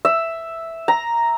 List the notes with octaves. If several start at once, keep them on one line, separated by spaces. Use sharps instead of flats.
E5
A#5